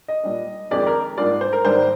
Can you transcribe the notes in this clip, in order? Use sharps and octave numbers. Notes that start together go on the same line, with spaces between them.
D#5
A#2 G3 D4
F2 D#3 G#3 D4 D5
A#4
G#2 G3 A#3 D4 F4 D5
C5
A#4
G#2 D#3 G3 A#3 D4 C5